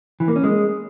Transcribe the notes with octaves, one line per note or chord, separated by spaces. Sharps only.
E3
A#3
C#4
G#3